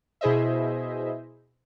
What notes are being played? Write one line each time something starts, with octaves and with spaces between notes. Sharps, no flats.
B2 E4 G#4 C5 D#5 E5